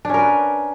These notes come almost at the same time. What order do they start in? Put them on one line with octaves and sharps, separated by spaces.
D4 C#4 A#4 B4